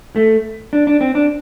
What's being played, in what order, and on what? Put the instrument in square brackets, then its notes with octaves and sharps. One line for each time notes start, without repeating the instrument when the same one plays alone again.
[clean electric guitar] A3
D4
D4
C4
D4